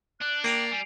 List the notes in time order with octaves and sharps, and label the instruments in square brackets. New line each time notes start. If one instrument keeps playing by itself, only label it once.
[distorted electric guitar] D4 [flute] F#6
[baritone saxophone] A#3 [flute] G5 [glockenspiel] C7 D7 F7
[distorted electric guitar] G3 [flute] G#5